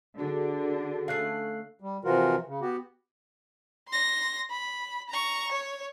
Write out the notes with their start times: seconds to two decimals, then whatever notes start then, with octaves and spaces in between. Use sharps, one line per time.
0.18 D3 D4 F#4 G#4 A4
1.08 A3 C#4 F5 F#6 C7
1.81 G3
2.05 C3 E3 F3 F4 F#4 A#4
2.47 C#3
2.61 B3 F#4 G4
3.89 C6 A#6
4.50 B5
5.09 A#5 C#6
5.52 C#5